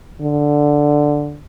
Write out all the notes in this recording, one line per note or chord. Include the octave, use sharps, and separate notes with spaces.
D3